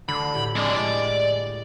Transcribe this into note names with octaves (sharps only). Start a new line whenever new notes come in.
D2 D3 B5 C7
A2 G4
F2 G#3 D4 G4 D5
A2 D5